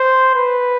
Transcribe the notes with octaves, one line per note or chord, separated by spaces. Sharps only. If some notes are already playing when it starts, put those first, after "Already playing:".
Already playing: C5
B4